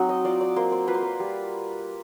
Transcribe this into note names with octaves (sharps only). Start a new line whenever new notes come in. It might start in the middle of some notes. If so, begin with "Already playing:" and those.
Already playing: F#3 C4 D#4
D#5
F4 D5
D5
A#3 C5
C5
F4 B4
C5
B4
G3